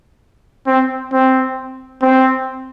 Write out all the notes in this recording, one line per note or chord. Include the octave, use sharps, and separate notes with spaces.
C4
C4
C4